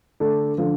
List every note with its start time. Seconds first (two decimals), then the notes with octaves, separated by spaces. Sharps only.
0.20 D3 A3 D4 A4
0.58 D3 F3